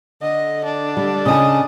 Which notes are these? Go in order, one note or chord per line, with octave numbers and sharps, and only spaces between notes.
D3 D#5
D4
G3
C#3 D#5 G#5